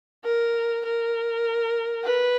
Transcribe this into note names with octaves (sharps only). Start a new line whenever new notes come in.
A#4
A#4
B4